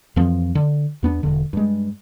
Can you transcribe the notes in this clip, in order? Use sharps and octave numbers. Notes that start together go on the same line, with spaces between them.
F2 E3 F3 C4
D3
E2 B3 D4
E1 D3
G2 G#3